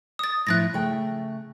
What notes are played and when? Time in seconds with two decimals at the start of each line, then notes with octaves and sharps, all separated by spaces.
0.19 D#6 A6
0.47 A2 F3 E4 F#6 A6 A#6
0.73 C#3 A3 G5